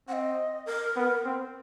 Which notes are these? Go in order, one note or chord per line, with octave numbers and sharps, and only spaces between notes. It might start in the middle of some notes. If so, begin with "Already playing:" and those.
C4 D#5 F#5
A#4
B3
C4